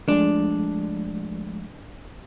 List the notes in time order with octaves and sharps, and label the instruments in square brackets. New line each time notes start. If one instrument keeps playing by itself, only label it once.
[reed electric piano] F3 G#3 A3 [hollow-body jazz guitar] D4